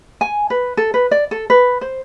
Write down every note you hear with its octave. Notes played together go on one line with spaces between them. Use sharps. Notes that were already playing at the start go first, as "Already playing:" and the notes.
G#5
B4
A4
B4
D5
A4
B4
C5